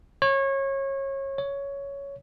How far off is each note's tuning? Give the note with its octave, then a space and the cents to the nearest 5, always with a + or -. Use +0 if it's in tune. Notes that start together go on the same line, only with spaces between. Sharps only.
C#5 -25
C#5 +10